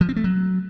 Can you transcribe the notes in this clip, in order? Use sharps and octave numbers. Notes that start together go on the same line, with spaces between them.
F3
C4
A3
F#3